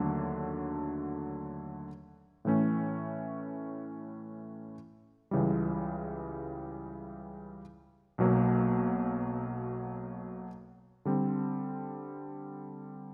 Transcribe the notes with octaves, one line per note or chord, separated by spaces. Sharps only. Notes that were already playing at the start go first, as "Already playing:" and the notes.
Already playing: D#2 D3 F#3 A3 D4
A2 E3 A3 C#4
C#2 C#3 E3 G3
B1 B2 F#3 A#3
D3 G3 C4